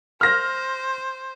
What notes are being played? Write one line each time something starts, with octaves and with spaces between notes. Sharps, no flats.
C5 F6 A#6